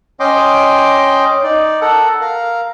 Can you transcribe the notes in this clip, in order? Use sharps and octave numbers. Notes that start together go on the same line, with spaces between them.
C#4 D#5 G5 C6 D6
D#4 D5
A4 A#4 F#5
A#4 F5